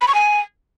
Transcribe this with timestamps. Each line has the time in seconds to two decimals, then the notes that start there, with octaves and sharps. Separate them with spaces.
0.01 B5
0.08 C#6
0.15 G#5